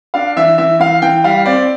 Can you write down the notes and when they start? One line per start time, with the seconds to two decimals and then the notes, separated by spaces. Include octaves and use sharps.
0.14 D4 F5
0.36 E3 E5
0.58 E3 E5
0.79 E3 F5
1.02 E3 G5
1.24 G3 F5
1.46 C4 D5